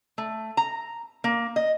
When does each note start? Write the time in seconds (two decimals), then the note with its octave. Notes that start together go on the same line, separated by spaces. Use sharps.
0.18 A3
0.57 A#5
1.24 A#3
1.56 D#5